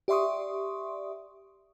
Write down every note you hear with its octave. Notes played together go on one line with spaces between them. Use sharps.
G4 D5 E5 C6 C#6 D#6